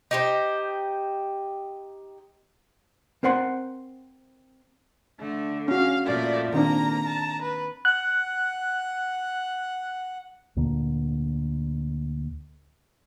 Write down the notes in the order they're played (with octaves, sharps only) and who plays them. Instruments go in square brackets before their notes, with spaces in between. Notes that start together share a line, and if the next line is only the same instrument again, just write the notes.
[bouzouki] D#4 G4 C5
[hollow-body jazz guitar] C4 A#4 C5 F#5 C6
[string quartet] D3 [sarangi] A3
[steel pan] C#4 F#4 [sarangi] F5
[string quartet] A#2 F3 A3 [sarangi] D5
[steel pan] D#3 C4 D4 [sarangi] A#3 [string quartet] A#5
[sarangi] A5
B4
[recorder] F#5 [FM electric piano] F#6
[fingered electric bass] D2 A#2 D3 A#3